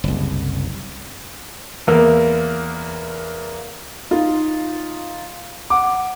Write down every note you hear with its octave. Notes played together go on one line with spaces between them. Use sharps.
F#1 C2
E2 A#3 A#4
D#4 F4
F#5 D6